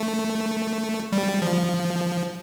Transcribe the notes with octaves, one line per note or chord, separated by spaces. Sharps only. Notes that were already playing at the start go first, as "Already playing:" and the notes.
Already playing: A3
G3
F3